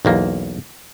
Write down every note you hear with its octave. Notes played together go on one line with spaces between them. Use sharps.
B1 E2 A#3